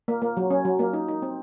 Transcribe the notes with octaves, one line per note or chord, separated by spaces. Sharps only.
A#3
A#3
F#3
C#4
F#3
A#3
D#4
D#4
C4